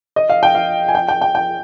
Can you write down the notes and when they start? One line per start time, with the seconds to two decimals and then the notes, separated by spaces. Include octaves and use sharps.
0.16 D#5
0.30 F5
0.43 G5
0.55 F5
0.88 G#5
0.95 G5
1.08 G5
1.21 G5
1.35 G5